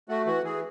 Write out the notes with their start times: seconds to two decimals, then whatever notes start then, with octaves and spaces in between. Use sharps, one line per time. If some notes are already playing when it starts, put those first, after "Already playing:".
0.09 A3 F#4
0.26 E3 F#4
0.43 E3 G#4